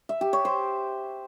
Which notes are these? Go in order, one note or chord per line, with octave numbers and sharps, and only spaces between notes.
E5
G4
C#5
C5